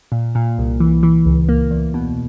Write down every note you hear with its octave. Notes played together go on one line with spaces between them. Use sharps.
A#2
A#2
C2
E3
E3
C#2
A#3
E2
B2